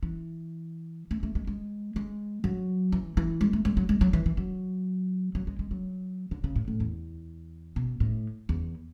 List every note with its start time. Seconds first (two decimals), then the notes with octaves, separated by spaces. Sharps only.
0.03 E3
1.11 A3
1.23 A3
1.35 G#3
1.47 G#3
1.96 G#3
2.44 F#3
2.92 E3
3.17 E3
3.41 G#3
3.53 A3
3.65 G#3
3.77 F#3
3.89 G#3
4.01 F#3
4.13 E3
4.26 E3
4.37 F#3
5.35 F#3
5.47 G#3
5.59 G#3
5.71 F#3
6.31 D3
6.44 C#3
6.56 A2
6.68 A2
6.80 E2
7.76 B2
8.00 A2
8.49 E2